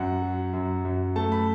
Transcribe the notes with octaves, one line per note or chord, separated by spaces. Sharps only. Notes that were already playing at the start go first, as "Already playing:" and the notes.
Already playing: F#2 F#5
F#3
F#2
F#2
A3 A5
B5